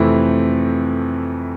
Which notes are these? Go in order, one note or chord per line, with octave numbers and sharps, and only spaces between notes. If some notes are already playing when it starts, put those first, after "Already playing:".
Already playing: F2 C3 E3 A3 C4 E4